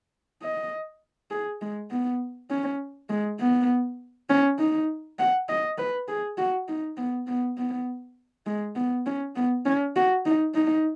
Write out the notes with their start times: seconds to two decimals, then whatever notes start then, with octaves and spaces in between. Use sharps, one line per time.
0.43 D#5
1.31 G#4
1.61 G#3
1.91 B3
2.50 C#4
3.10 G#3
3.40 B3
4.30 C#4
4.59 D#4
5.19 F#5
5.49 D#5
5.78 B4
6.08 G#4
6.38 F#4
6.68 D#4
6.97 B3
7.27 B3
7.57 B3
8.47 G#3
8.76 B3
9.06 C#4
9.36 B3
9.66 C#4
9.96 F#4
10.26 D#4
10.54 D#4